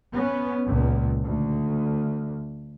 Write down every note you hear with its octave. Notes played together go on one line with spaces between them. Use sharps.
B3 C#4
C#2 A#2
D2